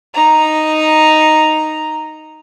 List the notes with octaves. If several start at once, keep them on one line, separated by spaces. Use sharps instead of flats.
D#4 A#5